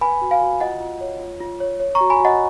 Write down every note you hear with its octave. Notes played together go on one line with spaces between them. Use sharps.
B4 G#5 B5
F#4
F5 G#5
F#4
F4 D#5 F#5
F4
C#5
F4
F4
C#5
C#5
A#5 C#6
F#4
G#5 B5
F#4 D#5 F#5